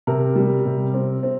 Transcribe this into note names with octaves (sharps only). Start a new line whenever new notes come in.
C3 A#4
G3
C3
C4
C4